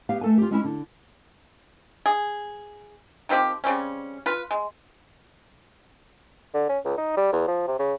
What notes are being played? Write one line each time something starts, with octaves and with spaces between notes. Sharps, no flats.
B3 G4 F5
A3 A4 G#5
F4 G4
G#3 C#4 E4
D3
G#4
D#3 F3 C4 G4
C#3 G3 C4 C#4
F4 B4
G#3
D3
C#4
C#2
D#4
G3
E2
F3
C3
C#3